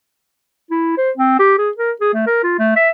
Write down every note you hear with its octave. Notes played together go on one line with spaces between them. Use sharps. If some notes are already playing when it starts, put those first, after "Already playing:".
E4
C5
C4
G4
G#4
A#4
G#4
A3
A#4
F4
A3
E5